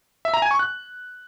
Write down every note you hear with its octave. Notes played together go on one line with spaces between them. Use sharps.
E5
A#5
G#5
C#6
F#6